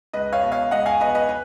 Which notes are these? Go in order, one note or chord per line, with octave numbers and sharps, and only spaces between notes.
C#2 B4 D#5
C#5 F5
B2
C#5 F5
C#2 D#5 F#5
F5 G#5
B2 B4 D#5
B4 D#5
B4